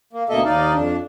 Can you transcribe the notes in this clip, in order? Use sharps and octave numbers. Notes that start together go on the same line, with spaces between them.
A#3
D2 B2 A#3 A4 D#5 E5
D#2 D#4 D5 F5
F2 D4